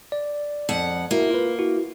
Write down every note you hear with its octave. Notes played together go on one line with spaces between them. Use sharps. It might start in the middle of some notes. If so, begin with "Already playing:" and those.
D5
F2 F#5
A#3 E4 F#4 E5
F4 B4
E4 F#4